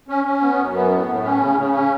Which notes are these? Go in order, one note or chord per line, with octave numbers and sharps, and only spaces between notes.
C#4
C#4
B3
F#2
B3
A2
A2
C#4
C#3
C#3
C#4